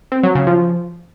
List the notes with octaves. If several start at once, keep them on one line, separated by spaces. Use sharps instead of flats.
C4
F#3
C#3
F3